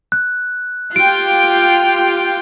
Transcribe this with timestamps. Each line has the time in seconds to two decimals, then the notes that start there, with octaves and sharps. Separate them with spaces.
0.12 F#6
0.96 F4 G4 G5 D7